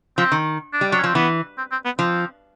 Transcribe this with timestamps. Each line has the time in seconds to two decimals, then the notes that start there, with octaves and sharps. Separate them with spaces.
0.18 F3 C4
0.32 D#3
0.73 D4
0.81 G3
0.91 F#3 D4
0.99 C#4
1.04 F3 C4
1.15 E3 B3
1.58 C4
1.72 C4
1.85 B3
1.99 F3 C4